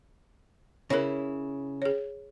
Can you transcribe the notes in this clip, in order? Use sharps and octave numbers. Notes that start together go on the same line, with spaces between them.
C#3 E4 A#4 C#5
G#4 C#5